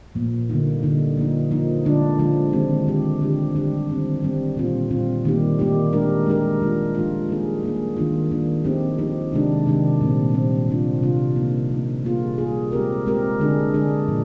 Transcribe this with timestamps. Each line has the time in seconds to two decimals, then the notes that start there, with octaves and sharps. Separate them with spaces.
0.15 A#2 F3 A#3
0.49 D3 G3 A#3 D#4
0.83 D3 G3 A#3 D#4
1.17 F3 A#3 D#4
1.51 F3 A#3 D#4
1.85 D3 F3 G#3 D4 F4
2.19 D3 F3 G#3 D4 F4
2.53 D#3 G#3 C4 G4
2.87 D#3 G#3 C4 G4
3.21 D3 G3 D4 G4
3.56 D3 G3 D4 G4
3.89 D#3 G3 C4
4.22 D#3 G3 C4
4.56 A#2 G3 C4 F4
4.90 A#2 G3 C4 F4
5.25 D#3 G3 A#3 D#4 G4
5.59 D#3 G3 A#3 D#4 G4
5.93 G#3 D4 G4 A#4
6.26 G#3 D4 G4 A#4
6.61 F3 G#3 D4 F4
6.95 F3 G#3 D4 F4
7.29 G3 A#3 D#4 G#4
7.63 G3 A#3 D#4 G#4
7.97 D#3 A#3 D4 F4
8.31 D#3 A#3 D4 F4
8.64 F3 C4 D#4 G4
8.98 F3 C4 D#4 G4
9.32 C3 D#3 G#3 D4 G4
9.67 C3 D#3 G#3 D4 G4
10.01 A#2 G3 C4
10.34 A#2 G3 C4
10.68 C3 G3 D4 F4
11.03 C3 G3 D4 F4
11.36 F3 A#3 D#4
11.70 F3 A#3 D#4
12.04 G3 A#3 F4 G#4
12.38 G3 A#3 F4 G#4
12.72 G#3 C4 G4 A#4
13.06 G#3 C4 G4 A#4
13.40 D3 G#3 D4 G#4
13.74 D3 G#3 D4 G#4
14.08 A#2 F3